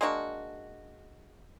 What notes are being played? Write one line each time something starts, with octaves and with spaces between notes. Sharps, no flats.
G#3 A#3 D4 F#4